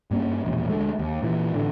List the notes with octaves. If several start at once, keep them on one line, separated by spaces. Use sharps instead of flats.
G2 A#3 C#4
E1 A#1
D2 G#3 A3
D#2
A#2 E3
A1 A2 D3